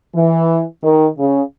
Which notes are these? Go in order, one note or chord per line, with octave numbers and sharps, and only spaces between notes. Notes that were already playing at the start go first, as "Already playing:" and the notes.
E3
D#3
C#3